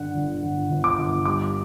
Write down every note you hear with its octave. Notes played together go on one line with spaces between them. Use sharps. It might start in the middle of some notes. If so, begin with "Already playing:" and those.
Already playing: G2 D3 F#5
G1
G1
G1
D6
G1
G3 D6